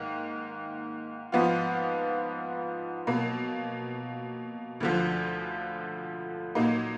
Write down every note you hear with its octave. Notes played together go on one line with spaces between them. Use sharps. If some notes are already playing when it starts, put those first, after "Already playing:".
Already playing: G#2 D#3 A#3
G#2 F3 B3 F4
B2 F#3 A#3
D2 D3 F3
A#2 F#3 A#3 D#4